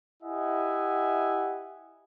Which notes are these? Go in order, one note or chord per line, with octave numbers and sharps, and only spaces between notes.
E4 G4 D#5 E5 F#5 G#5